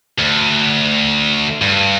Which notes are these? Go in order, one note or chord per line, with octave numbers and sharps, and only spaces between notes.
D2
G2